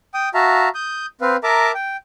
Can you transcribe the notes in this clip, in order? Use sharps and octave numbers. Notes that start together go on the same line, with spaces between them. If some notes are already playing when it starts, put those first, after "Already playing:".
G5 D#6
F#4 E5 F5 A5 A#5
D#6 G6
C4 B4 F5
A#4 E5 A5 A#5 D6
G5